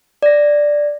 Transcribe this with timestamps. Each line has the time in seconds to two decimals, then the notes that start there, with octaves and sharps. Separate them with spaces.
0.23 D5 A#6